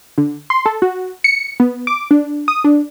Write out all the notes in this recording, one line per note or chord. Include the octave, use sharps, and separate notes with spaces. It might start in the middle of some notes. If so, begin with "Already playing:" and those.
D3
C6
A4
F#4
C#7
B3
D6
D4
D#6
D4